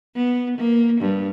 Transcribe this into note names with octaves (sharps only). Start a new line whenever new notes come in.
B3
A#3
G2